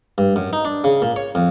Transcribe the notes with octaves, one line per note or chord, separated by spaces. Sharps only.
G2
F#2
D#4
D4
C#3
A#2
C#5
F2